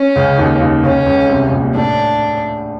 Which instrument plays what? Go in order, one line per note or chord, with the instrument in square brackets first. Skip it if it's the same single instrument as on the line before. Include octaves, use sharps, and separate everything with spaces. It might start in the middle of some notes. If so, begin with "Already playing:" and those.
Already playing: [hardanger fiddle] C#4
[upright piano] C#2 C#3
D#2 D#3
D#2 D#3
[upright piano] C#2 C#3 [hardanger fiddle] C#4
[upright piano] C#2 C#3
C2 C3
A#1 A#2
[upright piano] A2 [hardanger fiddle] D4